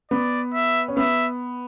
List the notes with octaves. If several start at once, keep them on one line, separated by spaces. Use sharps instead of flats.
B3 D5
E5
C#4
B3 E5